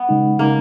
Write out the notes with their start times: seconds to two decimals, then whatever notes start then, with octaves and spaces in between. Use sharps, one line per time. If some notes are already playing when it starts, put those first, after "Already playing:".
Already playing: B3
0.09 C#3 G#3 D#4
0.39 C#3 G#3 A#3 D#4